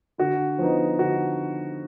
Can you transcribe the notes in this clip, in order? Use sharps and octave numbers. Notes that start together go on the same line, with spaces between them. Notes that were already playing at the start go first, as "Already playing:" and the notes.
D3 F#4
F3 B3 D#4
D3 F#4